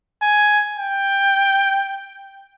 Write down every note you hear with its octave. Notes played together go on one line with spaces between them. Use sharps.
G#5
G5